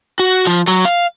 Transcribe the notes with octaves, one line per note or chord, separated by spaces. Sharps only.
F#4
F3
F#3
F5